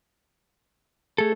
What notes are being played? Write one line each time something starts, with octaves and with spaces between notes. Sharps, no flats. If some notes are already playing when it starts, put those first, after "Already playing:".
A3 G#4 A4